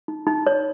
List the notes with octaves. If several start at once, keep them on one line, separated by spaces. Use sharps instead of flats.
D#4
D#4
C#5